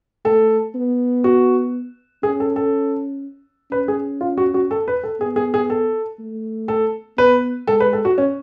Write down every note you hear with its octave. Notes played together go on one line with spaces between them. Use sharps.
A3 A4
B3
F#4
C#4 G#4
A4
A4
C#4 B4
G#4
F4
F#4
F#4
A4
B4
A4
B3 G#4
G#4
G#4
A4
A3
A4
B3 B4
G#3 A4
B4
A4
F#4
C#4